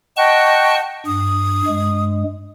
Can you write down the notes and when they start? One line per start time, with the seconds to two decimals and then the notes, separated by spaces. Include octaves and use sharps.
0.17 D#5 F#5 G5 A5 C#6 F#6
1.06 G2 D#6
1.67 G2 G#3